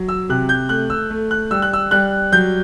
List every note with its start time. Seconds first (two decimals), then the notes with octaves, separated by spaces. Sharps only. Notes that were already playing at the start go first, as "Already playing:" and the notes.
Already playing: F#3
0.08 E6
0.29 C3 F#6
0.49 G6
0.69 A3 F#6
0.90 E6
1.10 A3
1.31 F#6
1.51 G3 E6
1.62 F#6
1.73 E6
1.91 G3 F#6
2.32 F#3 G6